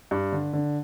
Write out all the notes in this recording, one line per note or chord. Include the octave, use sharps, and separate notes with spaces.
G2
D3
D3